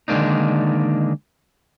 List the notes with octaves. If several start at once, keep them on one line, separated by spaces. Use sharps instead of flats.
D3 D#3 G#3 A#3 D4 D#4